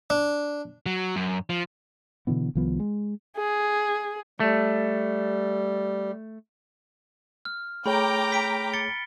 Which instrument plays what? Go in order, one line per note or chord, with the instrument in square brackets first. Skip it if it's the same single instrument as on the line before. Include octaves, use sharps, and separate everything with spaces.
[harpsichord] D4
[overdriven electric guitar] F#3
F#2
F3
[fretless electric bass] B2 D3 E3 B3
C2 D#3 F3 B3
G#3
[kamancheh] G#4
[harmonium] G3 [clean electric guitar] A3
[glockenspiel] F6
[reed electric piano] A3 G#4 C#5 [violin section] G5 A#5 D6 [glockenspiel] B5
[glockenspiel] B6 D7
A6 C#7 G7